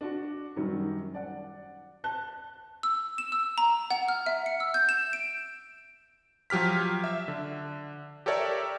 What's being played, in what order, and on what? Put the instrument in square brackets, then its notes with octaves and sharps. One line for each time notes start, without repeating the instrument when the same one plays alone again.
[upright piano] D4 F#4
F#2 D#3 F#3 G3
D5 F#5
A5 F#6 G7
[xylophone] E6
E7
E6
A#5
F#5
F6
E5
C#7
E6
G6
E7
D7
[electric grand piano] F3 F#3 G4 F6 B6
E5
D3
G4 A4 A#4 C#5 D5 E5